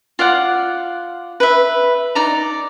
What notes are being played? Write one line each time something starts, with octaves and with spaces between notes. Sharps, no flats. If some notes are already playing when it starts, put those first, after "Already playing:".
F4 D5 F5 F#5
B4 E5
D#4 D5 A#5